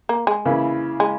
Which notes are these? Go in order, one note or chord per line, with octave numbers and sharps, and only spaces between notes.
A#3
G#3
C#3 E3 A#3 E4
G#3